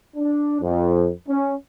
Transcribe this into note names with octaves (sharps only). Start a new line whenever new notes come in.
D4
F2
C#4